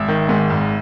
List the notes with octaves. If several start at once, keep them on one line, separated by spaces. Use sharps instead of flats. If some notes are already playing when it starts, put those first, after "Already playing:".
Already playing: G#1 E5
D#3
G#2
G#1